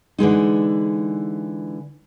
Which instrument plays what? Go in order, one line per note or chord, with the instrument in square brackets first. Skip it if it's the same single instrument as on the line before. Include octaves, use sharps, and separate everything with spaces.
[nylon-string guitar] D3 E3 G#3 D#4